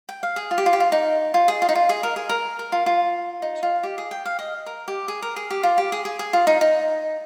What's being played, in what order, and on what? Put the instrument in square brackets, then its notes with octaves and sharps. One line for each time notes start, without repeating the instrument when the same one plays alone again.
[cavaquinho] G5
F5
G#4
F4
G4
F4
G4
F4
D#4
F4
G#4
F4
D#4
F4
G#4
A#4
G#4
A#4
A#4
F4
F4
D#4
F4
G4
G#4
G5
F5
D#5
A#4
G4
G#4
A#4
G#4
G4
F4
G4
G#4
G#4
G#4
F4
D#4
D#4